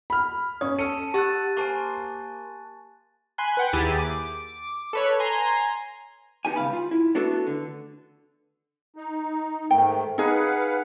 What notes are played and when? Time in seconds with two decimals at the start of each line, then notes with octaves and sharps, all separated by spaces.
0.10 B5 F6
0.61 C#4 C#5 D#6
0.79 C#4 A4 C#7 D#7
1.14 G4 F#5 A5 E6 F#6 A6 D#7
1.57 A#3 C5 G#5 A5 C6 C#6
3.38 G#5 B5 C6 F#6
3.57 B4 F#5 G5
3.73 D#2 E4 G4 G#4 A6 D#7
3.99 D6
4.93 A4 B4 C#5
5.19 G#5 A#5 C6
6.45 B3 D#4 G4 G#5
6.56 C#2 G2 F5 B5
6.73 F4
6.91 E4
7.15 A3 B3 D4 F#4 A4
7.47 D3
8.96 D#4
9.71 G#2 D#3 A3 G5
10.18 D#4 G#4 B4 F5 F#5